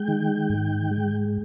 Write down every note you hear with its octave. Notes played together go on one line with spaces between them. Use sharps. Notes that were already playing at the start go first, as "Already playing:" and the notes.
Already playing: G#3 G5
D#3
G#2
G#3